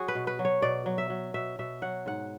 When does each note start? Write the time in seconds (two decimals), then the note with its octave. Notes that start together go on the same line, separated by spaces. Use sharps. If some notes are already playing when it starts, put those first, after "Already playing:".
Already playing: F#3 F#4 G#4
0.08 B4
0.15 B2
0.27 B4
0.39 F#3
0.45 C#5
0.62 B2 D5
0.86 F#3
0.98 E5
1.10 F#3
1.34 B2 E5
1.59 B2 E5
1.82 F#3 F#5
2.06 G#2 F#5